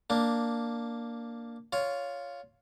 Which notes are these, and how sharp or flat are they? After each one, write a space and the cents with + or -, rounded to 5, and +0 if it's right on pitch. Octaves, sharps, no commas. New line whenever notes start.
A#3 +0 D4 +0
F4 +0 C#5 +15